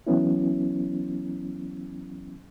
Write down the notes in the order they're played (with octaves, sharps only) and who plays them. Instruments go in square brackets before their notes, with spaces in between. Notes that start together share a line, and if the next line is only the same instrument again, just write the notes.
[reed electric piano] E3 F#3 B3 C#4 E4